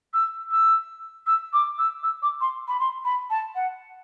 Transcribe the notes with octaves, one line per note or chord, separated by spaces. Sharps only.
E6
E6
E6
D6
E6
E6
D6
C6
B5
C6
B5
A5
F#5